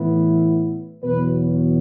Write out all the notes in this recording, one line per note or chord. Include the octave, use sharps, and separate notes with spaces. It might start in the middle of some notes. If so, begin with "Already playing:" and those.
Already playing: A2 E3 B3 E4
E2 B2 F#3 B4